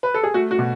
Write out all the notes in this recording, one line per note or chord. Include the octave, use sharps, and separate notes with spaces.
B4
A4
G#4
A3 F#4
F#4
B2